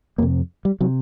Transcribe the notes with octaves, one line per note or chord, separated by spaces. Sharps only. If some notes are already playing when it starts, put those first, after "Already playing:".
F2 C3 A#3
G3
C3 F#3